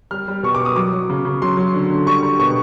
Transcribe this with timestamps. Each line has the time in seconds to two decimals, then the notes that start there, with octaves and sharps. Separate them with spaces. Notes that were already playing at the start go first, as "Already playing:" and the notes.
0.11 G3 F6
0.28 G3
0.43 B2 C#6
0.55 D6
0.60 B2
0.65 D#6
0.76 F#3 D6
0.93 F#3
1.09 C#3
1.25 C#3
1.42 F#3 C6
1.57 F#3
1.74 D3
1.90 D3
2.06 G3 C#6
2.23 G3
2.39 B2 C#6